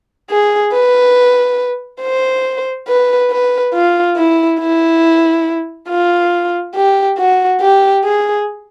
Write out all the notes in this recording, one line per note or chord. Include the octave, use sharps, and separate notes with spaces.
G#4
B4
C5
B4
B4
F4
E4
E4
F4
G4
F#4
G4
G#4